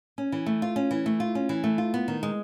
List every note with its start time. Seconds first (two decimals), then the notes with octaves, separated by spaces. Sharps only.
0.18 C#4
0.32 E3
0.46 A3
0.62 F4
0.76 C#4
0.91 E3
1.06 A3
1.20 F4
1.35 C#4
1.49 E3
1.64 A3
1.78 F4
1.94 B3
2.08 D#3
2.23 G#3